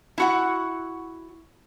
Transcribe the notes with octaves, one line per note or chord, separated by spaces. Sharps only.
E4 F#4 F#5